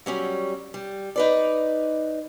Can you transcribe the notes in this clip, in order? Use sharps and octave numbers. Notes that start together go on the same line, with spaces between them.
F#3 G3 C#4
G3
D#4 B4 D5